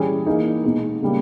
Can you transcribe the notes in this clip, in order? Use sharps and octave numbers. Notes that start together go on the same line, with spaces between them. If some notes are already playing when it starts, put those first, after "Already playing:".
Already playing: E3 G3 C#4 G#4
E3 A#3 D#4 G#4
B2 G#3 B3 D#4
C#3 G3 A#3